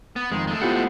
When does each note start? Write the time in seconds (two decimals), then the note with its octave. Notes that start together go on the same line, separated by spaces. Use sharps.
0.16 B3
0.31 F2 D#3 G#3
0.47 G#3 A3
0.62 B3 E4 F4 G4 C5 F#5